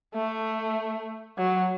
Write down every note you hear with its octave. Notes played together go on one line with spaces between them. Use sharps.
A3
F#3